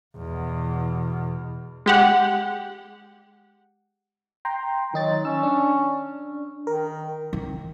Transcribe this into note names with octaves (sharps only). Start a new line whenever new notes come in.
E2 B2
G#3 G4 F#5
G5 A#5 C6
D#3 F#3 D#4 A6
C#4 E6
D4
D#3 A#4
D#3